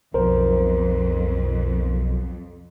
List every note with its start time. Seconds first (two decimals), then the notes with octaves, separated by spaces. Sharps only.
0.14 B1 F2 A#4 C5